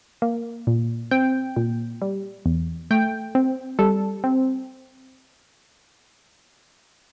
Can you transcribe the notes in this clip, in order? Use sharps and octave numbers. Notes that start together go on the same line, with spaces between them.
A#3
A#2
C4 G5
A#2
G3
E2
A3 G5
C4
G3 A4
C4